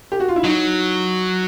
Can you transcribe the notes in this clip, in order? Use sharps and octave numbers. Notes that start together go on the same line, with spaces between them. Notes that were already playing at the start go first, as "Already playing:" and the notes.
G4
F#4
F4
E4
F#3 D#4